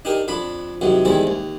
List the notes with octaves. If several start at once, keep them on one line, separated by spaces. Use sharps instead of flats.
D4 D#4 G4 A#4
F2 D4 B5
F2 C3 D#3 F#3
E2 D#3 G3 G#3 C4
D#2